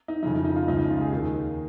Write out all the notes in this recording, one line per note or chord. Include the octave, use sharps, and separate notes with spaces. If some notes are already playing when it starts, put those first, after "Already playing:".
D#4
F2 C#3 F3 D#4
D#4
D#4
F4
C#2 C#3 F3 D#4
D#4
F4
G#4
D#2 D#3 G#4